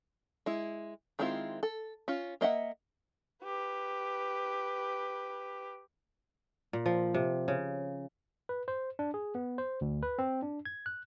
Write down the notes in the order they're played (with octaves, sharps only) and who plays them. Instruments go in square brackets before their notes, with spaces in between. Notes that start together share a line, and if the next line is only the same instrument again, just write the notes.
[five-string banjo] G#3 E4
D#3 G#3 C4 E4 F4
A4
C#4 F4
A#3 D#5 E5 F#5
[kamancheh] G4 B4
[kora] A#2
F3
C3
C#3
[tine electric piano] B4
C5
D4
G#4
B3
C5
D2
B4
C4
D4
G#6
F#6